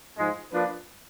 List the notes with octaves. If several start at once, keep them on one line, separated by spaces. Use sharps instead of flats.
G#2 F3 G#3
F3 A#3 D4 F4 B4